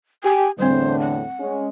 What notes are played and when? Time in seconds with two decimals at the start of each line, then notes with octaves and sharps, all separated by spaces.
0.24 G4 G#5
0.59 E2 A2 D3 G3 C4 C5
1.00 F#5
1.39 G#3 C#4